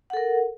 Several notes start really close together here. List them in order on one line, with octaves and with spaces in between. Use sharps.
F#5 A4 A#4